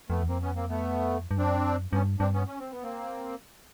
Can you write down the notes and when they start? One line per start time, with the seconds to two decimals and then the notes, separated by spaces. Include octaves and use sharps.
0.09 F2 A3 B3
0.23 E2
0.28 F2 A#3 C4
0.41 B3 C#4
0.56 A#3 C4
0.69 A3 B3
1.31 G2
1.38 F#2 C4 D4
1.93 G2 B3 C#4
2.19 G2 C4 D4
2.34 B3 C#4
2.47 C#4
2.60 C4
2.71 B3
2.83 A#3 C4